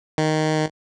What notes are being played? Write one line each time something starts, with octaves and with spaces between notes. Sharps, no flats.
D#3